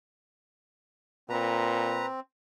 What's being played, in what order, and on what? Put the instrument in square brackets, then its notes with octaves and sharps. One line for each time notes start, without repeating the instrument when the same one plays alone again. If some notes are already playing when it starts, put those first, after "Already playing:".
[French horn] A#2 [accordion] C4 [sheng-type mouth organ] B4 A#5